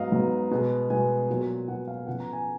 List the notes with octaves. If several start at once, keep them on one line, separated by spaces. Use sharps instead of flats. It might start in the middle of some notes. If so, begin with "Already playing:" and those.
Already playing: G#2 F#3 B3 D#5 F5
G#2 F#3 B3
B2 G#3 B3
B2 G#3 B3 G#5
A#2 F#3 B3
A#2 F#3 B3 F#5
F5
C#3 F3 B3 F#5
A#5
G#5